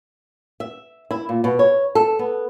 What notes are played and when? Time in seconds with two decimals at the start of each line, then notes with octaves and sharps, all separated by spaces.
0.60 E5
1.11 E4
1.29 A#2
1.44 B2
1.59 C#5
1.95 A4
2.19 B3